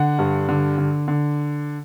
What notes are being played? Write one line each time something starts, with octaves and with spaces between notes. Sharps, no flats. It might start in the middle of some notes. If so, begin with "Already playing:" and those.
Already playing: D3 F#5
G2
D3
D3
D3